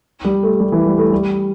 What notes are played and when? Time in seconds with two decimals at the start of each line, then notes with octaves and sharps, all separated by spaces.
0.24 G3
0.43 A3
0.60 G3
0.72 E3
0.86 G3
0.98 A3
1.12 G3